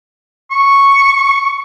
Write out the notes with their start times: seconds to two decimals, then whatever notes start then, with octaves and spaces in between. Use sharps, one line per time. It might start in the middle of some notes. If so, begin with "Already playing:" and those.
0.51 C#6